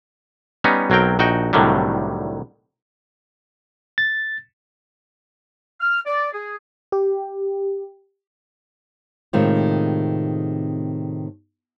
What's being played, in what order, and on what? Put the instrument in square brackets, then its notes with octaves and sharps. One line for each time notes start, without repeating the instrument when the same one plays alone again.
[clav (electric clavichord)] G3 B3 C#4 D#4
B1 F#3 C4 A#4 G5
A#1 D#4 F#4 G5
C2 A2 D3 D#3 F#3 G3
[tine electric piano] A6
[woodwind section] F6
D5
G#4
[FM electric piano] G4
[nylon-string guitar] A2 C3 D#3 G#3 C4 F4